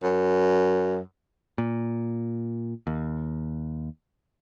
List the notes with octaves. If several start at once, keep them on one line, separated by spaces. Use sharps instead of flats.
F#2
A#2
D#2